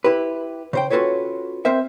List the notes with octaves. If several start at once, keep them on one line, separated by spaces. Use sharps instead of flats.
E4 G4 B4
C#3 C5 G5
C#4 F4 F#4 A4 B4 C#5
C4 A#4 C5 E5